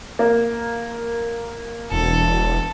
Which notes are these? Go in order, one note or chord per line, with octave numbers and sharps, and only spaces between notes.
A#3
E1 A4